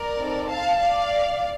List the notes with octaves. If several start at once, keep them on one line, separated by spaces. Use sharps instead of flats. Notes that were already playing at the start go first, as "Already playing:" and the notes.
Already playing: A#4 D5
C4 D#4 A4
F5 A5
D5 F5